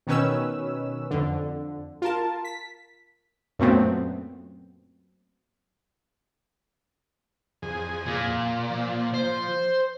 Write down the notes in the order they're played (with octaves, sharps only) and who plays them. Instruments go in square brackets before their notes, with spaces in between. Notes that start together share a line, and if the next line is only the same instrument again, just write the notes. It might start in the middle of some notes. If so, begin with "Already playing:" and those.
[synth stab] B2 D#3 C#4 B4 E6
F2 D3
F4 A#4 A5
B6
[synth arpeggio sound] F#2 A#2 A3 B3 C4
[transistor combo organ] F2 G#4
[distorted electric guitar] A#2
[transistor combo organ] F3
[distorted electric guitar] C5